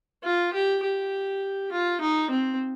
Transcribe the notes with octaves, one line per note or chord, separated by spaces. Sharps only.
F4
G4
G4
F4
D#4
C4